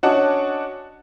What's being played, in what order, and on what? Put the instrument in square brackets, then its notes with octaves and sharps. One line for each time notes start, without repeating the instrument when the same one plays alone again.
[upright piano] C#4 D4 F#4 D#5 F#5 A5